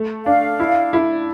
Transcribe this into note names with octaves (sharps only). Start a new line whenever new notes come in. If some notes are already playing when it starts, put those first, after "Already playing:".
Already playing: A3
D4 F5
E4
E4